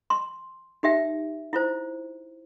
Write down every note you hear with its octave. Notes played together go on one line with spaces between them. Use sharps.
C6
D#4 G4 E5 G5
E4 F4 C5